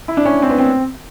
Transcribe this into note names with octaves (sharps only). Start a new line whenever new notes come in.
E4
D4
C#4
C4
B3
C4